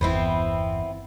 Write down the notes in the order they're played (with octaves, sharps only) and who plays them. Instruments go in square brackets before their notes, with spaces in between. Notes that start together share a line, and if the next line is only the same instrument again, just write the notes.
[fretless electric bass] G1 E2 [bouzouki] B3 C4 E4